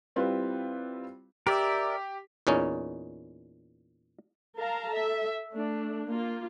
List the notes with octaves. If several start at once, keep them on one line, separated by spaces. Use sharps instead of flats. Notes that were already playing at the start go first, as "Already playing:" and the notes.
G3 C4 E4 F4 B4
G4 A#4 D5 E5
E2 A#2 C#4 D#4
A#4 F5 A5 A#5
A4 E5
A3 D4
A#3 F4